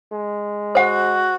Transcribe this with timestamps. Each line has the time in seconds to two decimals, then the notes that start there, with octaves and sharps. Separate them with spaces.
0.13 G#3
0.75 F#4 C5 F#5